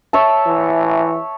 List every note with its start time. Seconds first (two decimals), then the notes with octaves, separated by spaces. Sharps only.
0.13 C#5 E5 A5
0.47 E3